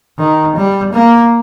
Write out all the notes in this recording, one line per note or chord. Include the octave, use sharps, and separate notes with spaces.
D#3
G3
A#3